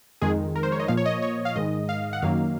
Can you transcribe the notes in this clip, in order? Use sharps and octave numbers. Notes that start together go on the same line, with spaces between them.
F2 D#3 G#3 G#4
A#4
C5
C#5
D#5
A#2 F3 A#3 F5
C#5
D#5
C#5
F5
G#2 D#3 G#3 D#5
F5
F#5
F#2 D#3 F#3 A#3 F5